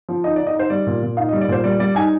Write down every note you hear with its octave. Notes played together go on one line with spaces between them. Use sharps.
F3
D#4 D#5
D5
D#4
D#5
D#4 C5
G3 D5
A#2
A#2
D#4 F5
D#5
G3
D5
A#2 C5
G3 D5
G3 D5
D#4 G#5